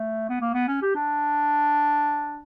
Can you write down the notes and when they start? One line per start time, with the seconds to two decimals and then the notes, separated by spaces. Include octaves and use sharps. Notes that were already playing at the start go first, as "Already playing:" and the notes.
Already playing: A3
0.29 B3
0.41 A#3
0.54 B3
0.68 C#4
0.82 G4
0.95 D4